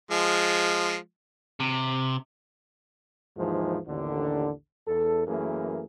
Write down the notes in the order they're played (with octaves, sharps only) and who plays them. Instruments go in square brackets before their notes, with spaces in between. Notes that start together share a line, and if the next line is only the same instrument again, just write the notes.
[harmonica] F3 G#3
[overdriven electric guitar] C3
[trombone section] D#2 G#2 E3 F3
A1 D#2 D3
E2 A4
F#2 E3 A3 A#3 G#4